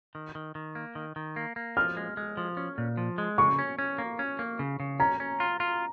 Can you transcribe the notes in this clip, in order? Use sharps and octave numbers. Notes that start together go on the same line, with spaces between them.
D#3
D#3
D#3
A#3
D#3
D#3
A#3
A#3
F3 F6
G#3
G#3
F3
C#4
A#2
F3
G#3
C#3 C#6
C#4
C#4
A#3
C#4
A#3
C#3
C#3
C#4 A#5
C#4
F4
F4